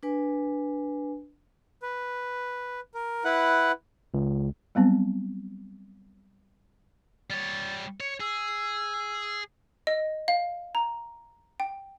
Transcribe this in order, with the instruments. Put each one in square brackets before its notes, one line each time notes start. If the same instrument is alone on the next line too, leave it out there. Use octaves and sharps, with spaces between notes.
[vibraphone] D4 B4 G#5
[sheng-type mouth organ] B4
A#4
E4 B4 F#5
[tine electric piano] C#2
[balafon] F#3 G3 B3 C4
[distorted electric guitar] G3 C#5 [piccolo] A6
[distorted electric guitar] C#5 [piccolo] C#7
[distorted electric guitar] G#4 [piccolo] E6
[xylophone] D#5
F5
A#5
G5